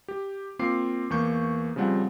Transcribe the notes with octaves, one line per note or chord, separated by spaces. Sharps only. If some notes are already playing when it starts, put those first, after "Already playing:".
G4
A#3 C4 F4 D6 C7
E2 A#3 C#6 G6
C#3 F3 G3 C4 F#5